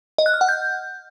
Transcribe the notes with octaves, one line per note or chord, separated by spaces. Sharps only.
D#5
F#6
F6
F#5
G6